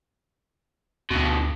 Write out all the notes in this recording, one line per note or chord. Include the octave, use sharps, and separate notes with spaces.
D2 G2 B2